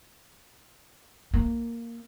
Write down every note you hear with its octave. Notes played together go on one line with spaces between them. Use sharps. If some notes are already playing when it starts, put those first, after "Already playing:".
A#3